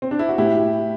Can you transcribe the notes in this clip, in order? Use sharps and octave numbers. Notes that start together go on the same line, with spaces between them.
C4
D4
E4
F#4
A2 E4 G4